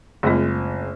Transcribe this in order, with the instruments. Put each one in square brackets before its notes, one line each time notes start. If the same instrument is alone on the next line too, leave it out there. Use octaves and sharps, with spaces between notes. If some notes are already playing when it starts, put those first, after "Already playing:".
[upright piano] F#1 G#3 [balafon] A3 C4 F4